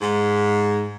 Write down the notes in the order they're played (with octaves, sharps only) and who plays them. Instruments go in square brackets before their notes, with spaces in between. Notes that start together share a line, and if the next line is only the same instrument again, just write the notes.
[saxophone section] G#2